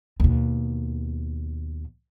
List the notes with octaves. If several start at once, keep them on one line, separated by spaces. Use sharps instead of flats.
D#2 B2